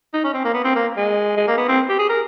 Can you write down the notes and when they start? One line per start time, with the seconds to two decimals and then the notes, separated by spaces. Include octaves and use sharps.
0.13 D#4
0.24 C#4
0.33 C4
0.44 A#3
0.54 B3
0.64 C4
0.76 A#3
0.96 G#3
1.37 G#3
1.47 A#3
1.57 B3
1.69 C4
1.89 G4
1.99 G#4
2.09 A#4